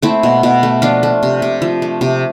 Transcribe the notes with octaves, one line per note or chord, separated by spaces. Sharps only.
A3 C4 E4
B2
B2
A3
F3 D4 F4
A3
C3
C3
F3
A3
C3